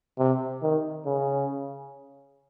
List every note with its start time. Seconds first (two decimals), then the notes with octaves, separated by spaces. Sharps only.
0.18 C3
0.62 D#3
1.06 C#3